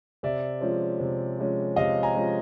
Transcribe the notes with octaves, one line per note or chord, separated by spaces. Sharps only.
C3 D5 E5
F3 G#3 C#4
C3
F3 G#3 C#4
C3 D#5 F5
G#5 A#5
F3 G#3 C#4